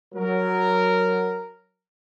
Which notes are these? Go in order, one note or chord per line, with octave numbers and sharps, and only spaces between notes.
F#3 A#4